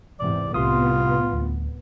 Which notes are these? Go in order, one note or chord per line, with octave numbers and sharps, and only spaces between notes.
E2 G#2 C3 D5
C2 A2 C3 B3 F4 C6 D#6
D2